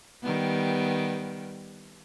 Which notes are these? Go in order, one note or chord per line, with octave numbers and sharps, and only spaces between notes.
D#3 G3 B3